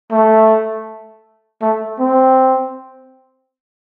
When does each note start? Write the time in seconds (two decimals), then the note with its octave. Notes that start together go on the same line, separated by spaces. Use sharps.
0.12 A3
1.62 A3
2.00 C4